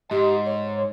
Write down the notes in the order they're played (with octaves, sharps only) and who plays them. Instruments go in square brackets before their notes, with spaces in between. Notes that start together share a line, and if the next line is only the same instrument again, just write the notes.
[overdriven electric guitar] G#2 [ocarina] G4 [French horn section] D#5
[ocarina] C#5